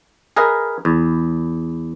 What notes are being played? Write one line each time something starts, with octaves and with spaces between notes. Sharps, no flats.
G#4 A#4 B4 D#5 F5
E2